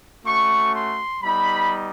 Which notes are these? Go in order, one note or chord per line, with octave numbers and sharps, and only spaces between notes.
A3 C#4 F#4 C#6
C6
G3 B3 D#4 B5